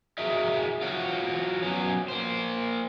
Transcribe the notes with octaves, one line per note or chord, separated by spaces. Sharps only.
F#4 G#4 A#4 D#5 E5
F4 F#4 C#5
F#3 B3 C#4
A#3 C5